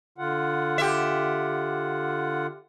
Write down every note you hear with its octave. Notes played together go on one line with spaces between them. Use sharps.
D3 F4 F#5
G4 E5